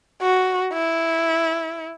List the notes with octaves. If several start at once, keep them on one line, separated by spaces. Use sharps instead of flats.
F#4
E4